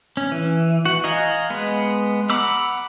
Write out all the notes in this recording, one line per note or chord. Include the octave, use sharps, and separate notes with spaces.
C#4
E3
F#4
D#5 F5 G#5 A#5
G#3 B3
F#5 A#5 B5 D6 E6